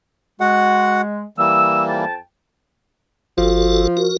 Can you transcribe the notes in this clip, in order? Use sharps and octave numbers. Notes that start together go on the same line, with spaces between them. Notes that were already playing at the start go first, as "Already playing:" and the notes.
G#3 F#4 F#5
E3 G3 A#3 E6
F2 G5 A5
G1 F3 F#4 A4
F#4 A#4